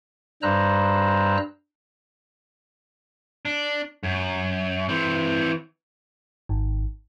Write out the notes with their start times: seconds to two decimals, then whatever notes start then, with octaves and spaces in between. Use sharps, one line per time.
0.43 G2 G3 C5 A#5 E6 F#6
3.45 D4
4.03 F#2
4.89 E3 C4
6.49 G#1